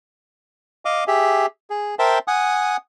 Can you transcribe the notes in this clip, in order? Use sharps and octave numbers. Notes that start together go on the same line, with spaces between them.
D#5 F5 D6
G4 G#4 E5
G#4
A#4 C5 E5 G5 A5
F#5 G#5 D#6